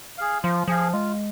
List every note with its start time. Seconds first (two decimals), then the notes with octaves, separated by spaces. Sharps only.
0.18 G#4 F5
0.44 F3 F4
0.68 F3 G#4 F5
0.92 G#3 F4